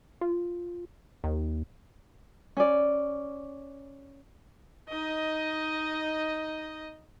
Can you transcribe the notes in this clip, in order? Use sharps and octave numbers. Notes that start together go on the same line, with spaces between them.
F4
D#2
C#4 D5
D#4 D#5